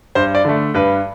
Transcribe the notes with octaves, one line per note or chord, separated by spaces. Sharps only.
G2 C5
D5
D3 A3
G2 B4